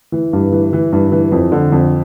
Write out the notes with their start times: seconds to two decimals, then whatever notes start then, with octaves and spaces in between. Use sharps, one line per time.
0.12 E3
0.33 G2
0.52 E3
0.73 E3
0.93 G2
1.12 E3
1.32 F2
1.52 D3
1.72 F2